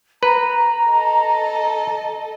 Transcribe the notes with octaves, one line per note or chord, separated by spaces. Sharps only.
B4 A#5
A4 D#5